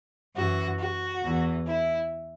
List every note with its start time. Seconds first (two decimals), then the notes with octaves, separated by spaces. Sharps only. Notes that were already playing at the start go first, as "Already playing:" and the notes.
0.36 F#2 E3 F#4
0.79 F#4
1.23 E2 E3
1.67 E4